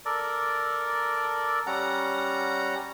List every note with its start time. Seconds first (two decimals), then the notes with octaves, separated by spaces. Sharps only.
0.05 A4 A#4 D5
1.67 G3 C#4 F#5 A#5